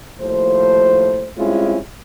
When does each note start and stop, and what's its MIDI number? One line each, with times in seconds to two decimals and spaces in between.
0.20 1.29 39
0.20 1.29 45
0.20 1.29 53
0.20 1.29 72
1.37 1.78 55
1.37 1.78 56
1.37 1.78 60
1.37 1.78 61
1.37 1.78 64
1.37 1.78 65